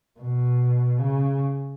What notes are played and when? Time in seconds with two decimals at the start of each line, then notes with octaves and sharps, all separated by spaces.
0.20 B2
0.99 C#3